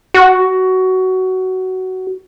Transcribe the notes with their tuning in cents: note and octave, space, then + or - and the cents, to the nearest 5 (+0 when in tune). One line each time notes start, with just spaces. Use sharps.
F#4 +15